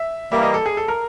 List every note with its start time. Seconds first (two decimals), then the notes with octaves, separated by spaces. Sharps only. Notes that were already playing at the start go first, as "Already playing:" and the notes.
Already playing: E5
0.31 E3 G3 A#3 E5
0.43 D#5
0.54 A4
0.66 G#4
0.77 A4
0.88 A#4